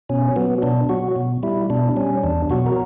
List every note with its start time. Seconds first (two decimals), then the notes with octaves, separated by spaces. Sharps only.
0.09 B2 C#4
0.36 F#3 B3
0.62 B2 D4
0.89 F#3 F#4
1.16 B2
1.43 G3 E4
1.70 B2 D4
1.96 G3 C#4
2.23 E2 D4
2.50 B2 F#3 F#4
2.66 A#4